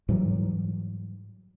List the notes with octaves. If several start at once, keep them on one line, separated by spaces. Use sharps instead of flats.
G#2 E3 F#3 G3